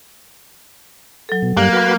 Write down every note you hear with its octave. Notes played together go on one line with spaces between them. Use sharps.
F#3 A4
B2
G2 G3 A#3 F#6
F#4 B4